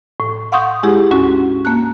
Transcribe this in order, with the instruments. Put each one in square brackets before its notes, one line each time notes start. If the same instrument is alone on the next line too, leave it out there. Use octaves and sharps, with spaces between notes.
[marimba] A2
F5 F#5 C6 C#6 D#6 G6
G#3 E4 G4 G#4
D2 G#2 C#4 F#4
A#3 A5 F#6